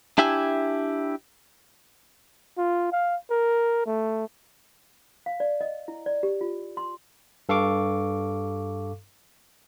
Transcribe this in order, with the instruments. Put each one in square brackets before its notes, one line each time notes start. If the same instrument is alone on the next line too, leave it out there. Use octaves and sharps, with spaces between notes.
[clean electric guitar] D4 E4 G4 E5 G#5
[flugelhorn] F4
F5
A#4
A3
[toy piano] F5
D5
D#5
E4
D5
G4
F4
C6
[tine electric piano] G2 A4 F5 C#6 D6